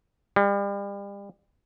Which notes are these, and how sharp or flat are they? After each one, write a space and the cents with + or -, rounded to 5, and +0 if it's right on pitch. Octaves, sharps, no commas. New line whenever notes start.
G3 +35